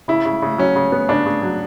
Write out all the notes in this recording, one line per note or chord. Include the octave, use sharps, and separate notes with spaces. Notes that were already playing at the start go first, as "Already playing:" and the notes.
C#3 E4
C#3
C#3
F#3 C#4
C#3
B3
C#3 D4
C#3
F#3